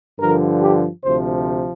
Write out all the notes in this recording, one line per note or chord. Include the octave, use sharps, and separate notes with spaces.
G2 D3 F3 A#4
G4
D2 C3 F3 C5